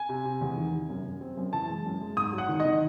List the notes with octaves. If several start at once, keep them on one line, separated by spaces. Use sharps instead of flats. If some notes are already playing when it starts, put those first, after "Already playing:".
Already playing: G#5
C3
C3
E2
D#3
C3
F#2
F#2
C4
F#2
E3 A5
G#3
F#2
G#3
G#2 D#6
F#3
F#5
D#3
D#5
D#3